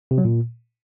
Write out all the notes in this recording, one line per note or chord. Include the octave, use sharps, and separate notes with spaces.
C3
F#3
A#2